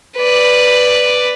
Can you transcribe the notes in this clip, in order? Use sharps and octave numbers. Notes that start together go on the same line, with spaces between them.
B4 D5